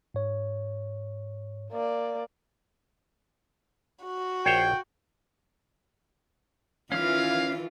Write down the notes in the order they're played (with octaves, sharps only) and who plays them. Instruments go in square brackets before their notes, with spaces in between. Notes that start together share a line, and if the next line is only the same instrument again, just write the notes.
[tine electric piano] G#2 C#5
[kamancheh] A#3 D5
[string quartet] F#4
[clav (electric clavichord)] A#1 C5 C#5 [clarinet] G5
[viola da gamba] D#3 F4 [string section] E3 [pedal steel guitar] C#4 F6 [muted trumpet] F5